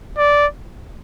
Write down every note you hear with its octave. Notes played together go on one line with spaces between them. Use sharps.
D5